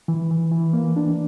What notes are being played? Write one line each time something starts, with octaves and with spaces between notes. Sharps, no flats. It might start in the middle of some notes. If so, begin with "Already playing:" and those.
E3
E3
E3
A#3
D4